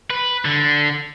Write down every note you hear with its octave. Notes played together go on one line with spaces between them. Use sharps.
B4
D3